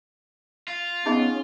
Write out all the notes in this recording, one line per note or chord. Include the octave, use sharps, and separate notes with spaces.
F4
B3 C#4 D#4 G#4 D#5